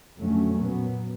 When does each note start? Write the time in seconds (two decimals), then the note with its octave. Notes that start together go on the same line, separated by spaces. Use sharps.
0.20 F2 D3 F#3 A3 C#4
0.58 A#2 F#3 B3